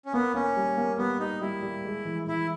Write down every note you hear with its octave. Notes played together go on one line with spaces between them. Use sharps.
C#4
A#3 B3
A#3 C#4
G3
A#3
G3 B3
D#4 G4
G3 E4
G3
G#3
E3
E3 E4